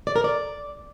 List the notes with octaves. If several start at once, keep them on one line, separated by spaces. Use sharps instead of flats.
D5
A#4
D5